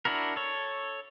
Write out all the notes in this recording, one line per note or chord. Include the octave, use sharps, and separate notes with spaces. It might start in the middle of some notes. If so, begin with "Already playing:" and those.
D4 E4 F#4 A#4
A4 C#5